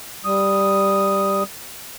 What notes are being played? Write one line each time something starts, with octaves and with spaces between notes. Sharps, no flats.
G3 D#6